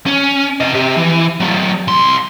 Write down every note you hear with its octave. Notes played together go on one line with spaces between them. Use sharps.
C#4
C3 D#5
C3 G4
E3
F#3 A3
C2 C6